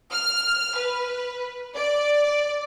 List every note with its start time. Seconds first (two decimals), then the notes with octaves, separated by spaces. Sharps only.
0.12 F6
0.77 B4
1.76 D5